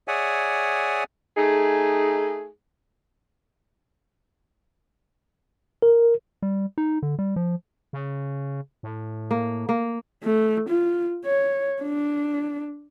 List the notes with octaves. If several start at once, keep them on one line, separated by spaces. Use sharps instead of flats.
G#4 C#5 D5 E5 F#5 G#5
A3 D#4 G#4
A#4
G3
D#4
D3
G3
F3
C#3
A2
A#3
A#3
A3
F4
C#5
D4